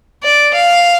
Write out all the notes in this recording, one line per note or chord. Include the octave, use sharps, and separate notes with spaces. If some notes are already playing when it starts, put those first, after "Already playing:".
D5
F5